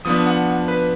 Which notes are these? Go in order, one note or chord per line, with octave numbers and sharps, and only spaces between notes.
F3 B3 D4 D#6
F#5
B4